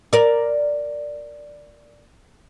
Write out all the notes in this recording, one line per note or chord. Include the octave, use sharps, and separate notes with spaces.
A#4 D5